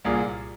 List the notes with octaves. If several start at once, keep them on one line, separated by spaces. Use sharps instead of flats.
C2 A#2 A#3 G#4